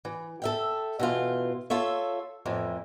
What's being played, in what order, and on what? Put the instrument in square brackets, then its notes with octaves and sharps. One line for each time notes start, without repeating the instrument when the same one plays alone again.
[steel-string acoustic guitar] E3
A4 E5 G5
B2 E3 F4
F4 A4 C#5 E5
F2 A2 E3